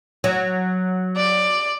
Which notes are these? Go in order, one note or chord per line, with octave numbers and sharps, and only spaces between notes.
F#3
D5